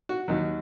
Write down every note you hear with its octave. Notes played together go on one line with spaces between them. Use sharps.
F#4
D#2 D#3 F#3